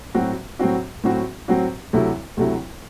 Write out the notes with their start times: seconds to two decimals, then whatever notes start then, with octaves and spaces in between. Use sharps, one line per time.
0.15 A2 F#3 C4 F#4
0.59 A2 F#3 C4 F#4
1.04 A2 F#3 C4 F#4
1.48 A2 F#3 C4 F#4
1.93 D2 C3 F#3 A3 E4
2.37 D2 C3 F#3 A3 E4